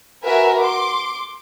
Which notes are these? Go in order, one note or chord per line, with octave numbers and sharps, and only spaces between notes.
F#4 A#4 B4 E5 G#5
C6 D6